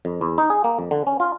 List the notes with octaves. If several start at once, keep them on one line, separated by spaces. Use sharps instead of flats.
F2
E2
D#4
G#4
A#3
F2
D3
C#4
F4